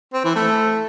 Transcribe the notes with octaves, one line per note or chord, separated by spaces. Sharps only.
C4
E3
A3